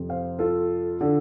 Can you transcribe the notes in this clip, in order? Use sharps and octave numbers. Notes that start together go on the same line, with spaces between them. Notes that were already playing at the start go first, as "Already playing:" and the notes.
Already playing: F2 C3
C5 F5
F4 A4
D3